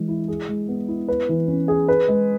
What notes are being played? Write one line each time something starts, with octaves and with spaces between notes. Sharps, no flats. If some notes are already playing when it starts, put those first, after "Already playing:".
Already playing: E3 G#3
E4
G#4
G#3
B3
E4
B4
E3
C#4
G#4
B4
G#3